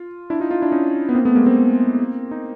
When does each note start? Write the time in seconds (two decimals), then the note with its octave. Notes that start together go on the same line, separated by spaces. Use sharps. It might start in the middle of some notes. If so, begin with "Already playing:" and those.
Already playing: F4
0.30 D4 E4
0.40 D#4 F4
0.51 D#4 F4
0.61 D4 E4
0.72 C#4 D#4
1.09 B3
1.15 A#3 C4
1.25 A3 B3
1.35 G#3 A#3
1.46 A#3 C4
2.31 D#4